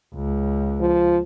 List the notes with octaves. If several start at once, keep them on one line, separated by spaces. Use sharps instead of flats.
C#2
F3